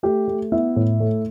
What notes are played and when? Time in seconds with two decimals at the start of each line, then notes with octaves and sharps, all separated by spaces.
0.03 A3 G4
0.28 A3
0.52 B3 E4
0.76 A2
1.00 A3